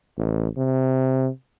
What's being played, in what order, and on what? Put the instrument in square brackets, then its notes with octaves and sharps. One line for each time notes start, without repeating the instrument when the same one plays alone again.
[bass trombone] A1
C3